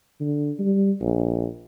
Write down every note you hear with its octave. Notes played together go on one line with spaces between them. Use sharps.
D3
G3
A#1